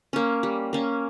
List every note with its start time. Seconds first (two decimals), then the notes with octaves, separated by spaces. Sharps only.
0.13 A#3 C#4
0.43 G3
0.73 A#3 C#4